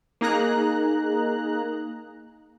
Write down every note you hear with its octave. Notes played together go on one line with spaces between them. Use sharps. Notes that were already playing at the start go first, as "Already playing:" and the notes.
A#3 D#4 G#4 A#5 F#6